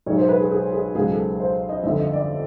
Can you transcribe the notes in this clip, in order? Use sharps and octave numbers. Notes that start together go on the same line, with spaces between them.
B1 B2 G#3 C#5
C5
B4
G#4
G#4
G#4
C#2 B2 F#3 G#4
A4
C5
D#5
G1 F2 D3 E5
D#5
D5